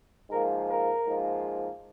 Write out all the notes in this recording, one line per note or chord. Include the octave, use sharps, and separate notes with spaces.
G#2 F3 A#3 A#4
A#4
G#2 F3 A#3